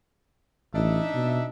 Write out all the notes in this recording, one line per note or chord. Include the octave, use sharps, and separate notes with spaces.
A1 D4 D#4 E5
B2